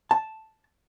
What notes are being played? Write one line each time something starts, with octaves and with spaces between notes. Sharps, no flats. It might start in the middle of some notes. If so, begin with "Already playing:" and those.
A5